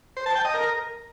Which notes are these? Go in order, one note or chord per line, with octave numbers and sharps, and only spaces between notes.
C5
A5
G5
D#5
A#4